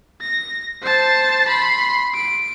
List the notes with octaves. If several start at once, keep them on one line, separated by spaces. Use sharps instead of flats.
A#6
C5 A5
B5 C6
D7